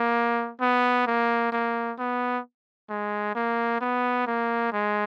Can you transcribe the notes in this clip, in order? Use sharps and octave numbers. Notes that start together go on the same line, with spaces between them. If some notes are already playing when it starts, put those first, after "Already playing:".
Already playing: A#3
B3
A#3
A#3
B3
G#3
A#3
B3
A#3
G#3